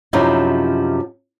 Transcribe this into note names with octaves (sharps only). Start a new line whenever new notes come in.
F#2 C3 F3 C#4 D#4 E4